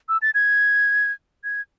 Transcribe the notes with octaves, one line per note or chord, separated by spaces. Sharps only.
E6
A6
G#6
G#6